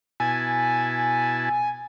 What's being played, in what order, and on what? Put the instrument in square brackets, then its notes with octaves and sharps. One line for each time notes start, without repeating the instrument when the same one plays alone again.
[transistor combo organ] B2 E4 A5 [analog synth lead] G#5